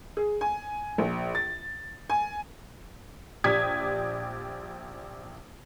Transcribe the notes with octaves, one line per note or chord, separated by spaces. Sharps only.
G#4
G#5
A#1
A6
G#5
A#1 G4 D5 D#6 G#6 B6